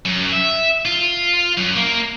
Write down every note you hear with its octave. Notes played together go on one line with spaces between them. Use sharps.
F#2
E5
F4
F#2
A#3